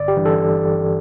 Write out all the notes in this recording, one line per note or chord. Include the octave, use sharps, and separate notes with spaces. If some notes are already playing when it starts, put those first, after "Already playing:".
Already playing: G1 D5
G4
G2 E3
A4